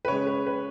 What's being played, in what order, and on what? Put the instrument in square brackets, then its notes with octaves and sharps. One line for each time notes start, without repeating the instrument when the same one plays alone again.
[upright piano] B4
C#3 G#3 C#5
B4
B4